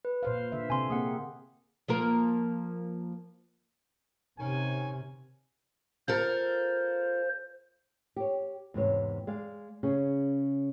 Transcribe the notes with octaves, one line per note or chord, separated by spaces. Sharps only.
B4
A#2 C5 F5
D3 E5
C3 C4 G#5 C6
A#3 C4 G#4 F#5
F3 A#3 A#4
C3 D#3 C#4 G#5
F4 A4 A#4 C5
G4 C#5
E2 G#2 C3 C#5
G#3 D5 F5
C#3 C#4 G#4